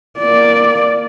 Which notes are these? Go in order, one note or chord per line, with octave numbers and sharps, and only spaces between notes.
A#3 D5